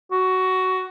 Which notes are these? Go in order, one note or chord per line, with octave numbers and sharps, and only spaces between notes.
F#4